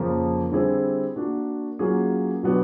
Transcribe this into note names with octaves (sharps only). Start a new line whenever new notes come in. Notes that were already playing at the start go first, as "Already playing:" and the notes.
Already playing: F2 C#3 F3 A#3
D3 G3 C4 E4 G#4
A#3 D4 F#4
F#3 A#3 C#4 F4 G#4
B2 F#3 B3 D4 G4